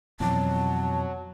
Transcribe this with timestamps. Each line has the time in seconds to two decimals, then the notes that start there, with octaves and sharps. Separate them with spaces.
0.20 F2 B2 E3 F#3 A5